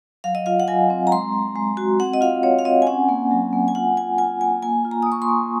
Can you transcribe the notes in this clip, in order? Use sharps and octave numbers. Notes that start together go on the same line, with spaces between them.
F#3 F5
D#5
F4 F5
F#5
F#3 G#5
C4
A#5
G#3 C6
G#3
G#3
F#4
C4 F#5
D#5
F4 F5
C4 C#5
F5
C4 D#5
G#5
C#4 F#5
A#3
F#3
A#3
G#5
F4 F#5
F4 G#5
F4 G#5
A#3 G#5
A#3 G#5
F4
A#5
D#6
A#3
C#6
C6
A#3